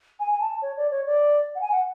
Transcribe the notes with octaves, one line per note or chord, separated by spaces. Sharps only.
G#5
G#5
A5
C#5
D5
C#5
D5
F#5
G#5
F#5